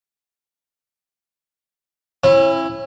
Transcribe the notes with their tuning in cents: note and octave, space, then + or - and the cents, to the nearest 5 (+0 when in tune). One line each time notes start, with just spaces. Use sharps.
C#4 -35 E4 +10